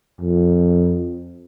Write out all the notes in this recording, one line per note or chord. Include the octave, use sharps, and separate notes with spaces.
F2